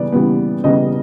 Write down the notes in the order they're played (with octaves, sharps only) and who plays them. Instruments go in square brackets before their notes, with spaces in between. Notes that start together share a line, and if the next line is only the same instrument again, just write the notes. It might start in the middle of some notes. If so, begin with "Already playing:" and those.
Already playing: [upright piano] C#3 E3 G3 B3 D5
C#3 E3 G3 B3
C#3 E3 G3 B3 D#5